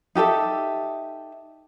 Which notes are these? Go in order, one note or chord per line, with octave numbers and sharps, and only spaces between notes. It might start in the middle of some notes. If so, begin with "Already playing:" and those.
D#4 G4 A4 E5